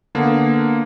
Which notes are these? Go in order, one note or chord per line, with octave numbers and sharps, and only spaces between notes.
D3 A#3 B3